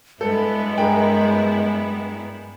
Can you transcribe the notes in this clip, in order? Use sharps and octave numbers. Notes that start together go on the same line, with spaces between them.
G2 G#3 B3 E4 A4
G#4 A#4 G5